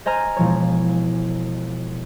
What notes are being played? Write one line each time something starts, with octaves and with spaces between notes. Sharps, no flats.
C5 D#5 G#5 A#5 F6
E1 F3 C#5